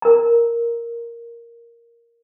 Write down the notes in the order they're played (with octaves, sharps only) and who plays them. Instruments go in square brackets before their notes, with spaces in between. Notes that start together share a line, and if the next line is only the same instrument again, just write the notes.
[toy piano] A#4 A#5